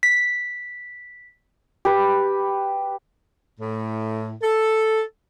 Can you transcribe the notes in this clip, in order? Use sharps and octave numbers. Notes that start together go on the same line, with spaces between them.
B6
G4 B4
A2
A4